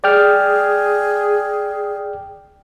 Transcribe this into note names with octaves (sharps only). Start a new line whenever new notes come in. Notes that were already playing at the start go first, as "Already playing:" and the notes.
G#4 D5 G5 F6